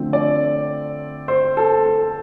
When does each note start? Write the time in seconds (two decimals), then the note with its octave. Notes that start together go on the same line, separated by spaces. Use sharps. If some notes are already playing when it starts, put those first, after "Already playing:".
Already playing: D3 F3 A3 C4
0.13 D5
1.28 C5
1.57 A4
1.86 A4